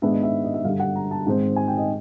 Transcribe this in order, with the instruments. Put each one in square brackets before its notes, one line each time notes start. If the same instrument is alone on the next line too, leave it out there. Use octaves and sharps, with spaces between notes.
[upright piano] G#2 D#3 G#3 B3 D4 E5
D#5
E5
D#5
E5
G2 D3 G3 F5
F#5
A#5
A5
G#2 D#3 G#3 C4
G#5
G5
D#5